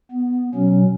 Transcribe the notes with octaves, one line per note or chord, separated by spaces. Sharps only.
B3
B2 F#3 C#4